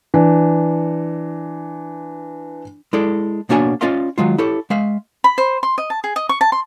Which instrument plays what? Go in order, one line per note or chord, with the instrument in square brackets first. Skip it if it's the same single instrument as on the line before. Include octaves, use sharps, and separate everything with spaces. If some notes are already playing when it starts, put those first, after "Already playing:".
[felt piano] E3 D4
[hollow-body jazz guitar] G#3 E4 A4 D5
B2 A#3 D4 F#4 C#5 G#5
C#4 F4 D5 D#5 F5 C6
D#3 F#3 G#3 F4
E4 G4 A4 C#5
G#3 E5 F5
[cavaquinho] B5
C5
C6
D#5
A5
G#4
D#5
C#6
A5
C6